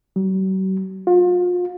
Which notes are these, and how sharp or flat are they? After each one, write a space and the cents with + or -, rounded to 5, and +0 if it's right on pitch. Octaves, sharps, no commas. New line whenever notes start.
F#3 +45
F4 +35